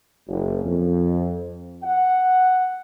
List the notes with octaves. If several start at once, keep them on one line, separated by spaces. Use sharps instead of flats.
F#1
F2
F#5